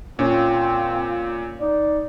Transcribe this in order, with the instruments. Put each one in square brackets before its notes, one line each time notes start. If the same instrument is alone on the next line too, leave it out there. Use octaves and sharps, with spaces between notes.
[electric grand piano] A#2 [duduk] C4 [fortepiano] C#4 [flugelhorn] F4
[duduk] D#4 [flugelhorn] D5